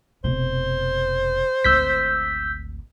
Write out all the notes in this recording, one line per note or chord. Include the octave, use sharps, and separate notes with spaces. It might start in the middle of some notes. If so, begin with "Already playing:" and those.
F1 B2 C5
G#1 D2 E6 G6 B6